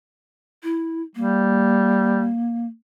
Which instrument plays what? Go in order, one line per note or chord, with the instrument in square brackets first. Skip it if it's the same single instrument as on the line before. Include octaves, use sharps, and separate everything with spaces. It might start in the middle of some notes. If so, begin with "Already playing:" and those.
[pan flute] E4
[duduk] G3 [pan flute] A#3